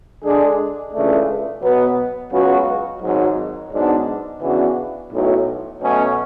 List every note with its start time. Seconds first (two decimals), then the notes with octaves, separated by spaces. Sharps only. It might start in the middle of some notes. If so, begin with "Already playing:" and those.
0.23 D3 G#3 D4 G#4
0.93 C#2 C#3 E3 A3 D4
1.62 B2 F#3 B3
2.32 C#2 C#3 F#3 B3 F#4
3.02 G#1 G#2 F#3
3.72 G#2 F#3 B3 D4
4.41 C#3 E3 B3 D4 F#4
5.10 B1 A2 F#3
5.80 B2 F#3 A3 C#4